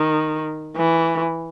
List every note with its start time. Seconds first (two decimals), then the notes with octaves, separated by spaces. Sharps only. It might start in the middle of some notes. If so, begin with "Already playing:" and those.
Already playing: D#3
0.76 E3